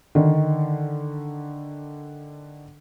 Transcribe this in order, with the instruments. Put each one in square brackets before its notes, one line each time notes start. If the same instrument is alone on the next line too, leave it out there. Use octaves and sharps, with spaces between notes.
[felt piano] D3 D#3